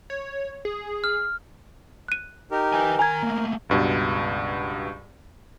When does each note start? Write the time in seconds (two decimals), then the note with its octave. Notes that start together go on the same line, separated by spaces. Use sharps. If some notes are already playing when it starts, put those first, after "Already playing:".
0.10 C#5
0.65 G#4
1.04 F6
2.08 F#6 D#7
2.51 D#4 G4 A#4
2.73 B4 G#5
2.99 D#3 A#4 G#5 A#5 G#6
3.22 A3 A#3
3.69 C#2 G2 B2